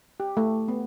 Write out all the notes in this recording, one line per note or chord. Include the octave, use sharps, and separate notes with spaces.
G4
A3
B3